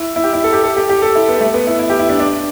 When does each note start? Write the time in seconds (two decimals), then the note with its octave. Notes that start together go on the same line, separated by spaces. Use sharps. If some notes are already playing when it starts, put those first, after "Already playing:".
Already playing: E4
0.16 E4
0.24 G4
0.33 E4
0.44 A4
0.53 G4
0.64 A4
0.76 G4
0.89 G4
1.02 A4
1.15 E4
1.28 B3
1.41 A3
1.54 B3
1.67 E4
1.79 E4
1.90 G4
1.99 E4
2.09 D4
2.20 D4